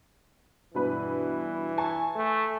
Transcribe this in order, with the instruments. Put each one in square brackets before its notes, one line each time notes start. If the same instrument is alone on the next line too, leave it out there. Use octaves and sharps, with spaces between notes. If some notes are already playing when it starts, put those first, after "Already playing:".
[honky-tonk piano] G2 B2 B4 [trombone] E3
[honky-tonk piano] G#5 A5 C#6
[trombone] A3